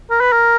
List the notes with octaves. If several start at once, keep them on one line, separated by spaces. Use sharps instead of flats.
A#4
B4
A#4